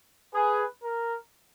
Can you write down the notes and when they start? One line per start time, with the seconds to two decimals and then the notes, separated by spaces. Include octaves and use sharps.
0.35 G#4 B4
0.83 A#4